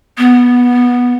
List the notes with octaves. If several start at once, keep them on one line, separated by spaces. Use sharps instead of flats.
B3